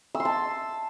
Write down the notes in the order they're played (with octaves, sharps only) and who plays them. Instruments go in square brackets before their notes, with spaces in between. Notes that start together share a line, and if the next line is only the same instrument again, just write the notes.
[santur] E6
C6
A5